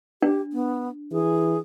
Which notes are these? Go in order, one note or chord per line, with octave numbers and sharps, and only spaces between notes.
D4 G4
B3
E3 G#4